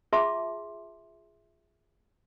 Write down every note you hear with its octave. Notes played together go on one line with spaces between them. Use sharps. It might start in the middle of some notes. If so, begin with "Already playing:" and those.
F4 G#4 E5 A5 C6 D6